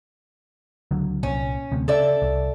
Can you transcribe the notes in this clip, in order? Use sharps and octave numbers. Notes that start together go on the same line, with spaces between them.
C#2 D3 F#3
C2 A#2 C#4
D2 C3
C#3 A4 D5 E5
C2